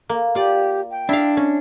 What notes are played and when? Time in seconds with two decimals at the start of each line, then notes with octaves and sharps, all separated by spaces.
0.09 A#3
0.35 F4 G4 D5
0.91 G5
1.09 D4 E4 F5
1.37 C#4